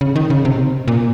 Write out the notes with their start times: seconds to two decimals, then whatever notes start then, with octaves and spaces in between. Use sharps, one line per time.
0.01 C#3
0.16 D#3
0.30 C#3
0.45 C3
0.88 A#2